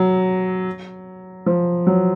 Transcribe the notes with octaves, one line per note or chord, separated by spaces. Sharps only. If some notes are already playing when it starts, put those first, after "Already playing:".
Already playing: F#3
F3
F#3